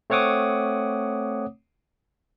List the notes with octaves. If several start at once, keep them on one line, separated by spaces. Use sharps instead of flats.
A3 C4 C#5 F#5 D6 D#6